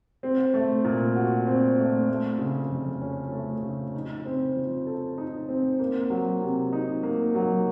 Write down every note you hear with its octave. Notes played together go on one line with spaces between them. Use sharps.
C4
A3
A#2
F#4
C4
A3
A3
C#3
F2
C#4
A3
C#3
D#4
C4
F3
A4
D#4
C4
A#3
F#3
C3
D#4
A#3
F#3